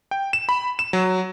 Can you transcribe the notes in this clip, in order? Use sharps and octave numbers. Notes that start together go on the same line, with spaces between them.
G5
E7
B5
E7
F#3